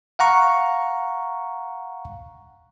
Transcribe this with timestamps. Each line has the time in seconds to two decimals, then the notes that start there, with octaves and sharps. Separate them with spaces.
0.19 F5 F#5 A#5 C#6